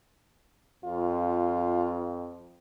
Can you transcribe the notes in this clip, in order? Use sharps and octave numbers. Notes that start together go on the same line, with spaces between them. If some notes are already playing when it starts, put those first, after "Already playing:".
F2 F4